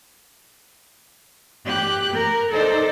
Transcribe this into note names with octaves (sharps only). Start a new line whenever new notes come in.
G4 F#6 G6
A#4
D#4 A4 C5 D5